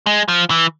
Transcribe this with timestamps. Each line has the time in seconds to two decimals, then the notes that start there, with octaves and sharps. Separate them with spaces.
0.06 G#3
0.28 F3
0.50 E3